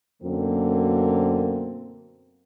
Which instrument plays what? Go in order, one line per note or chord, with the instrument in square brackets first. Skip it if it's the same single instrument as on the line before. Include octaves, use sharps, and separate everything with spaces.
[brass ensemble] F#2 B2 D3 A#3 C4